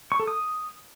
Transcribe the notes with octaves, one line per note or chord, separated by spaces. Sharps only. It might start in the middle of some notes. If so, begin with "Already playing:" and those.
C#6
A4
D#6